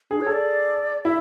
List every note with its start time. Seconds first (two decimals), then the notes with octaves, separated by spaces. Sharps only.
0.11 D4 G#4
0.21 C#5
0.26 A4
0.32 D5
1.05 E4 E5